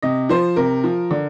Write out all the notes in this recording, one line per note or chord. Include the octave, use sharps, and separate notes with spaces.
C3 D#5
F3 C5
C3 A#4
F3
D3